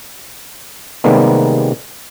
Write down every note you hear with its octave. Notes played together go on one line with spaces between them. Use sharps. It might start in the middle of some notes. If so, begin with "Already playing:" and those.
C3 D#3 G3 G#3 A#3 B3